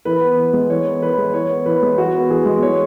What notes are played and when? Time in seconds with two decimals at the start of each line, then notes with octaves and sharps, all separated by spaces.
0.05 E3 B4
0.21 B3
0.38 E3
0.53 G#3
0.70 E3 C#5
0.86 B3
1.02 E3 B4
1.18 G#3
1.33 E3 C#5
1.49 B3
1.66 E3 B4
1.83 G#3
1.98 E3 F#4
2.15 B3
2.30 E3 G#4
2.46 G#3
2.62 E3 C#5